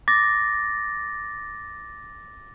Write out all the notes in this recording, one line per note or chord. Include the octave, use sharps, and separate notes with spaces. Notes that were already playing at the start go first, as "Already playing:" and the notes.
D6 A6 A#6